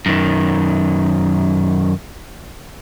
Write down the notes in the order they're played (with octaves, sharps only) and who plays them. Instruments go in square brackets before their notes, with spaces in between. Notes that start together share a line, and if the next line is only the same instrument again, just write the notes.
[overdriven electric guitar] F#2 D#3